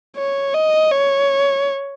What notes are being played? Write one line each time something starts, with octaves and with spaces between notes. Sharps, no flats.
C#5
D#5
C#5